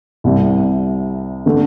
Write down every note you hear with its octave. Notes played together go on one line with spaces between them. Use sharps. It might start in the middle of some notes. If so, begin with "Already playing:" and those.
C2 C3 G3
D3 A3